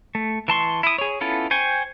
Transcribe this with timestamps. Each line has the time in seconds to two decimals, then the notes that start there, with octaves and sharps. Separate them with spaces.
0.15 A3
0.48 E3 A5 C6 C#6
0.83 E4 D#6
0.98 G#4 C#5
1.21 B3 C#4 E4 F4 A4
1.51 C5 G5 G#5 C#6